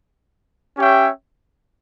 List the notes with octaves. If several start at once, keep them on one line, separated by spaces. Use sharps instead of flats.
C#4 G4 C#5 E5 G5